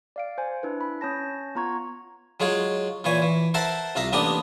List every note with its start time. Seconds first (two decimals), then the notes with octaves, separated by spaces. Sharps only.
0.16 D5 F5 D7
0.38 C5 G#5
0.63 D4 E4 B4
0.81 B5
1.01 C#4 C#5 A5 A#6
1.55 B3 F4 A#5 C#6 G#6
2.40 F#3 G#3 F4 C#5
3.04 A#2 E3 C#5 G#5
3.22 E3
3.54 A#4 C5 E5 F#5 A5
3.96 C2 F4 E5 A#5
4.13 A1 A#3 B3 D4 G4 D#6